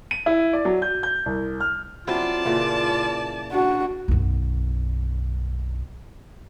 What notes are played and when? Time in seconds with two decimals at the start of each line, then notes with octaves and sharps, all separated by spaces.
0.11 D#7
0.26 E4
0.53 D5
0.65 F#3
0.82 G6
1.03 G6
1.26 C2
1.61 F6
2.07 F#3 C4 E4 F4 D5 A5
2.45 A#2 C#3 E3
3.52 D4 F#4
4.08 B1 F#2